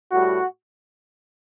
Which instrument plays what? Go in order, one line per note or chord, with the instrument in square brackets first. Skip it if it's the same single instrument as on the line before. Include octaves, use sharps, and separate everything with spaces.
[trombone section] A2 G3 F#4